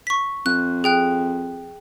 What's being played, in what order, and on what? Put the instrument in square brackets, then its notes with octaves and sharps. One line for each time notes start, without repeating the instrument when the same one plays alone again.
[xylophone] C#6 B6
[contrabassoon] F2 [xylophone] F#6
[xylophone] G#4 G5 F#6